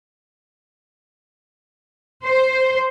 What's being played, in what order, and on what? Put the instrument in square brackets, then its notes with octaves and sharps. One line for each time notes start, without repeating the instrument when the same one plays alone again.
[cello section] C5